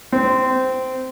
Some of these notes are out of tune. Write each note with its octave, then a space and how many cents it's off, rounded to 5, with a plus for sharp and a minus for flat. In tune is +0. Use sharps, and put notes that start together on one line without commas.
C4 -15